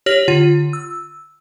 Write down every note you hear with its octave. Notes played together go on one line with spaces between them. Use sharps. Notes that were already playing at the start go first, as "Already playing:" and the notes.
G4 C#5 F6 A#6 F#7
D3 F4
E6